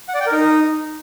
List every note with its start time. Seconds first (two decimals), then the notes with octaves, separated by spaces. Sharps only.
0.08 F#5
0.14 D5
0.20 G5
0.26 A#4
0.32 D#4